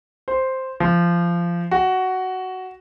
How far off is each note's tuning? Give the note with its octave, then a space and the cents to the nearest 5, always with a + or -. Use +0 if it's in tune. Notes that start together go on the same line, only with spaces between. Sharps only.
C5 +0
F3 -20
F#4 +10